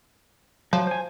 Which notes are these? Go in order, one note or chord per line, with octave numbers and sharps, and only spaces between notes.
F3 F#3
C5 G#5